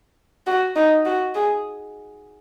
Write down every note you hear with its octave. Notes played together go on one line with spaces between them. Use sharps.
F#4
D#4
F#4
G#4